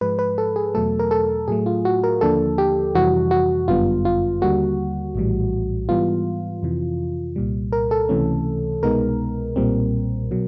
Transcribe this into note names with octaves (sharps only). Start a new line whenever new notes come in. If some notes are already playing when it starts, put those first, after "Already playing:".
G#2 F3 G#3 B4
B4
A4
G#4
E2 B2 F#3 A3 A4
A#4
A4
A2 F#3 A3 G#4
F4
F#4
A#4
D#2 D3 F3 A#3 D4 A4
G4
F2 C3 E3 G3 F#4
F#4
G1 F#2 D3 G3 B3 F4
F4
D#2 D3 G3 A#3 F#4
A#1 A2 E3 G3
G#2 E3 G3 B3 F4
F2 C3 E3
C2 A#2 G3
A#4
A4
C#2 C3 E3 A3 C#4
C2 B2 G#3 B3 D#4 A#4
B1 A#2 G3 C4
B2 F#3